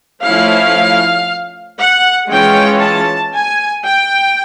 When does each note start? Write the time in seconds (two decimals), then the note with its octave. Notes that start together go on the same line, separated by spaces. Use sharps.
0.25 F3 A3 C#4 E4 F5
1.79 F#5
2.30 E3 G#3 C#4 F4 G5
2.81 A5
3.33 G#5
3.85 G5